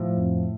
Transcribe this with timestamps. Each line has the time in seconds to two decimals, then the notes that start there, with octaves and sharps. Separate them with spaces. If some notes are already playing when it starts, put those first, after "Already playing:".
Already playing: A2 F3
0.17 F2